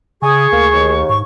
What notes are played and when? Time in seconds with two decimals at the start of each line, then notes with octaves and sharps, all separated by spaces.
0.22 C#3 G#4 G#5 C#6 D#6
0.52 D2 A#3
0.73 D#2
1.09 G#2 C#6